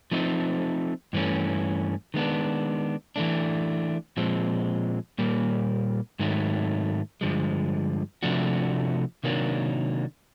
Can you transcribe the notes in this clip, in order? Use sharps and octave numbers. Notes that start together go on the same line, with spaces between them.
F3 A3 C4 D#4
G2 E3 A3 C#4
D#3 G#3 B3 D4
E3 A3 D4
A#2 F3 G#3 C4
A#2 G3 A#3
G#2 D#3 F#3 A3
G2 D3 F3 G#3
C3 F3 A3 D4 F#4
C3 D#3 F#3 A#3 D4